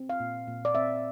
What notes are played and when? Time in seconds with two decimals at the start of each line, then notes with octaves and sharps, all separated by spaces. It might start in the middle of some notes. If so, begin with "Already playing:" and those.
Already playing: C4
0.09 F5
0.20 A#2
0.48 A#2
0.65 D5
0.75 C4 E5